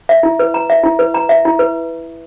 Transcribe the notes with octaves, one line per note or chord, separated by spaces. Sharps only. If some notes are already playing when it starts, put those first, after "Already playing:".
E5
E4
B4
A#5
E5
E4
B4
A#5
E5
E4
B4